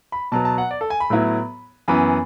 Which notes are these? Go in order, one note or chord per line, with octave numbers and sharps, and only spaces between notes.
B5
B2 F#3 B3 A5
A5
F#5
D5
A4
G#5
B5
A2 F#3 B3 E4
F#2 E3 B3 B5